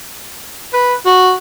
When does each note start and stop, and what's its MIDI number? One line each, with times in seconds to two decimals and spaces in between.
0.73 0.94 71
1.06 1.33 66